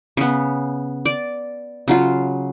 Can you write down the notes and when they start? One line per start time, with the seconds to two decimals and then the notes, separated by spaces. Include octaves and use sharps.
0.17 C#3 B3
1.05 D5
1.88 C#3 F#3 F4